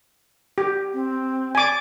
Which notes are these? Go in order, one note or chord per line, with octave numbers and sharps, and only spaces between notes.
G4
C4
D5 G#5 D6